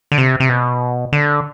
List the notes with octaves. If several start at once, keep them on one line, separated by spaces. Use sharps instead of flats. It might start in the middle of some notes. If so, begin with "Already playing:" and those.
D3
C3
C3
B2
D3